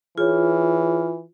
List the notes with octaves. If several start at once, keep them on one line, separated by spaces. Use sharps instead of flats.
E3 F4 G#4 C#5